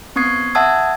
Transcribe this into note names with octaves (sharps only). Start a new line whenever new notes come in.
B3 C4 C#6 D#6 G#6 C7
E5 F#5 A5 D#6 E6 G#6